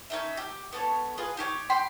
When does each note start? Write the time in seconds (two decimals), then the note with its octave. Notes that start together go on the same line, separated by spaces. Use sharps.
0.10 C#4 D#4 E5
0.37 G4
0.73 B3 A4 C#5
1.17 F4 G#4 B4 D#5
1.37 D#4 G4 C#5
1.70 G5 B5 C6